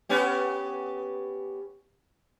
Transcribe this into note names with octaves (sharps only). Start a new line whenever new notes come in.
B3 C#4 G4